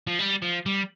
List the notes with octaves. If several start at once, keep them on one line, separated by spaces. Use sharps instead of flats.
F3
G3
F3
G3